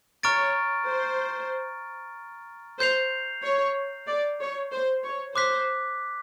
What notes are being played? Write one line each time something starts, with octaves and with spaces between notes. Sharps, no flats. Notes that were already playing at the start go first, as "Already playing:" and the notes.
C#5 A#5 C#6 F6 A6 D7
C5
C5 G6 C7 F7
C#5
D5
C#5
C5
C#5
C5 D6 F#6 B6